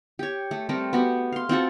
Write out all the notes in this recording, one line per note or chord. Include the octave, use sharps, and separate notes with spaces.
G4 C#5
A3
G3 A3 C4 A#4
B3 F#4 G4
F5 C6
C4 F4 F#4 A4